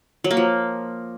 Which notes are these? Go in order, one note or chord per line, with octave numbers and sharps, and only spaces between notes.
F#3
A#3
F3